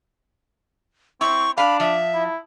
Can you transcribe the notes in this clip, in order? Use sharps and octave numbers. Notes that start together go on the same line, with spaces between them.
C4 E4 C#6
D4 F5 B5
F3 E5
E4